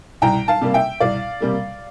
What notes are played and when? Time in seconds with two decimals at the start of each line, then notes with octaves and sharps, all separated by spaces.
0.22 C2 G5 A#5
0.48 F5 A5
0.61 C3 G3 A#3
0.74 E5 G5
1.00 C2 D5 F5
1.40 C3 G3 A#3